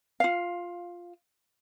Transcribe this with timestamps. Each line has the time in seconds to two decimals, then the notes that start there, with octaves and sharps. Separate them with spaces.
0.20 F4 F5